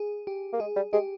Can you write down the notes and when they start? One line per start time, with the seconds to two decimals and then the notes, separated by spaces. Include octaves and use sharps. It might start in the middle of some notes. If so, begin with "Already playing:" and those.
Already playing: G#4
0.27 G4
0.53 A#3
0.60 G#3 G#4
0.76 G3
0.93 G#3 G4